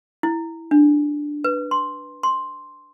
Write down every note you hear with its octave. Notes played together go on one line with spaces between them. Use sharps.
E4
D4
B4
C6
C6